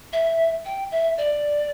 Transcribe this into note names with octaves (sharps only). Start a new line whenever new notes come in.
E5
G5
E5
D5